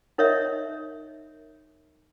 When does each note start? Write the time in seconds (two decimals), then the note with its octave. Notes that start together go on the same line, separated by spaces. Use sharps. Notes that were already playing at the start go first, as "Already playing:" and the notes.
0.18 D#4 A#4 C#5 D#5 E5